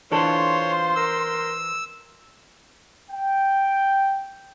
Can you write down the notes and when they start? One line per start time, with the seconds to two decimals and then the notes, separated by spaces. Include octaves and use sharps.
0.12 E3 D4 F4 A4 C5 C#5 C6
0.96 A#4 E6
3.11 G5